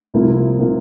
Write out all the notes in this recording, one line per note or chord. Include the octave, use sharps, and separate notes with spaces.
C2 C3 F3 A#3 E4
C3 F3 A#3 E4